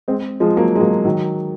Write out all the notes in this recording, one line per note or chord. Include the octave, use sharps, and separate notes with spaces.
G#3 C4
F3 G#3
F#3 A#3
G#3
F#3 A#3
D#3 F#3